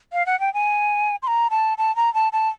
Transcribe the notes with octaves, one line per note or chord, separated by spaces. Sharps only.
F5
F#5
G5
G#5
C6
A#5
A5
A5
A#5
A5
A5